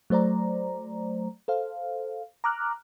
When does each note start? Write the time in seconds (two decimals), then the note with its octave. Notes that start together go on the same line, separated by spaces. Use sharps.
0.10 F#3 A3 C5 D5 A#5
1.48 A4 C5 F5
2.44 A#5 D6 F6 F#6